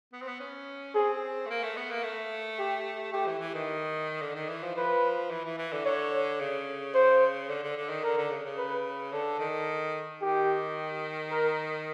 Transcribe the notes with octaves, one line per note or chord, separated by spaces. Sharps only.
B3
C4
B3
C#4
C4 G#4
A3
A#3
A3
B3
A#3
A3
G4
A3 G4
E3
E3
D#3
D3
D#3
E3
F3
F3 B4
E3
E3
E3
D3
D3 C#5
C#3
C5
D3
D3
D3
D#3
D3 A#4
D3
C#3
C#3
B4
D3 A4
D#3
D#3 G4
A#4